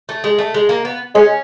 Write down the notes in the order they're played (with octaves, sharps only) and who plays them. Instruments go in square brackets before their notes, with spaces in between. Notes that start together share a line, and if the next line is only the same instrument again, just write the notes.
[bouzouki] A3
G#3
A3
G#3
A#3
B3
[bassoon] G#3 [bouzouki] C#4